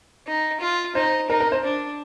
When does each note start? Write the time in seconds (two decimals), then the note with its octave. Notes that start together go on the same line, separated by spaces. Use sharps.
0.27 D#4
0.61 F4
0.95 D#4 C5
1.29 D#4 A#4
1.40 A#4
1.52 C5
1.64 D4